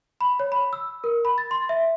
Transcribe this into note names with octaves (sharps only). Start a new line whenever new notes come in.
B5
C#5
B5
E6
A#4
B5
A6
C6
E5